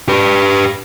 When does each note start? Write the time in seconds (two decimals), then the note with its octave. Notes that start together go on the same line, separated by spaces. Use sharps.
0.08 G4 B4